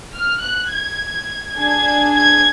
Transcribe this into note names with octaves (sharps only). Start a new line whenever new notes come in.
F6
F#6
G#6
D4 G#4 G#6
G#6